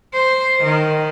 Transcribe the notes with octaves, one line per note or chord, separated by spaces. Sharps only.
C5
D#3